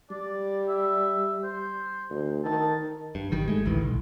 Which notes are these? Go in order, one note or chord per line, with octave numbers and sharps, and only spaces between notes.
G3 D5
E5
C5
D2
D#3 A5
G2
G#1 D#3 G3
G#3 A3
A1 D2 D#3 E3
B1